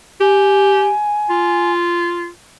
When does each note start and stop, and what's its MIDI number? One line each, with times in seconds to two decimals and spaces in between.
0.20 0.93 67
0.20 1.71 80
1.30 2.27 65